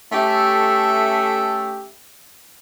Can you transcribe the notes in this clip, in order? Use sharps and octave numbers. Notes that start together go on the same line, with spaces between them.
A3 C#4 G4 A4 E5